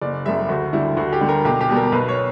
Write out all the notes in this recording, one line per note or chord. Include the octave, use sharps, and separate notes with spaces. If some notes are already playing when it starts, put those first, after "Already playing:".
F#1 D5
F#2 C#3 G3 E5
D2 F#4
D3 G3 E4
D2 F#4
G4
D3 G3
A#4
B1 G4
G4
B2 G3
A#4
B1 B4
C#5